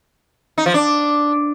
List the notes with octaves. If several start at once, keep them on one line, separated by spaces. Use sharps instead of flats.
D#4
F3
D4